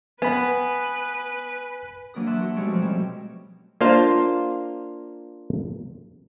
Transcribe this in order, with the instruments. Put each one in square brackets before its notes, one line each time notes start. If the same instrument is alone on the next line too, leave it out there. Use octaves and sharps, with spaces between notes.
[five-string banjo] B3 [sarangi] B4 [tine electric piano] G#5 B5
[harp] E3 F#3 A#3 D4 B4 D#6
E5 A5 C6 E6 F#6
F#4
B2 F#3 G#3 A3 C#4 G4
F3 C4
B2 F#3 G3 C4 C#4
[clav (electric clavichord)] A#3 D4 F4 C5 F5